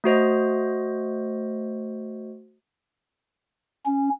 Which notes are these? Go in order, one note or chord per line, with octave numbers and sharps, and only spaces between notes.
A3 F#4 C5 D#5
C#4